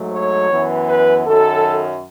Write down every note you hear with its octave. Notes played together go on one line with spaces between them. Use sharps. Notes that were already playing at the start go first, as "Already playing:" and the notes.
Already playing: G#2 F#3 A3
C#5
F#2 E3 B3
B4
F#2 D#3 F#3 A4